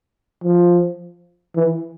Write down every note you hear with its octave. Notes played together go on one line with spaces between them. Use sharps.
F3
E3